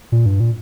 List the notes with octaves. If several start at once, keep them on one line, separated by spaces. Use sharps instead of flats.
A#2
G2
A#2